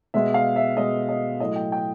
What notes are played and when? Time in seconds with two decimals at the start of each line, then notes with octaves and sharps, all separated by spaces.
0.14 B2 G#3 E5
0.34 F5
0.56 E5
0.77 B2 G#3 D#5
1.09 D#5
1.40 A2 F#3 D#5
1.56 G5
1.72 G5